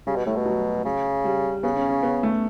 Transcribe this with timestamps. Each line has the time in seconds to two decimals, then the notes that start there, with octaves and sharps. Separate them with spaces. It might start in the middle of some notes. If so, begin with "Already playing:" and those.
0.07 C#3 G3
0.16 B2
0.26 A2 A3
0.36 B2
0.46 F#3
0.85 C#3
1.25 G3
1.63 C#3 B3
1.77 C#4
1.90 C#4
2.03 B3
2.23 A3